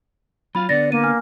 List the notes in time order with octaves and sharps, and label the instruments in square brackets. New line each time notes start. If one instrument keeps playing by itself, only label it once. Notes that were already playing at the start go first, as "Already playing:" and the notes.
[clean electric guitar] F#3 F4 F5 [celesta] B5
[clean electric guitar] D3 B3 [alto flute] D5 [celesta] A6 A#6
[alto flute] A#3 [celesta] D#7
[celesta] G#5 F6